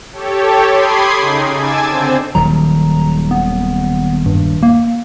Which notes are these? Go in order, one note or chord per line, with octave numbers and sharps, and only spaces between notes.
G4 A4 C#5
B5 C6 D6 D#6 G#6 C7
C#3 D#4
G#5 A5 D6 E6 G#6 A6
D3 C4 C5
D#1 D#3 F#3 A#5
B3
G2
A#3